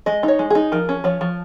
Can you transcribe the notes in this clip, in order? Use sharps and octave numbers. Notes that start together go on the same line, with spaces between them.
G#3 D#5
D#4
C#5
G#3
D#4 G#4
F3 A#4
C#4
F3 C#5
F3